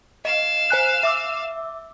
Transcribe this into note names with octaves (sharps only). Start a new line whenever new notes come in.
D#5 F5 E7
C5 G#5 F#6
E5 D6 E6